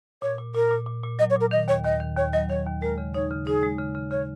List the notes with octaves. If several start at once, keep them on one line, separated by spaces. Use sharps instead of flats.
A#2 C#5
A#2
A#2 A#4
A#2
A#2
A#2
F#3 D#5
C#5
A#2 A#4
D#3 D#5
D#2 C#5
D#2 D#5
D#3
D#2 C#5
F#3 D#5
D#3 C#5
D#2
G#3 A#4
C#3
D#4 C#5
C#3
D#4 G#4
G#3
C#3
C#3
C#3 C#5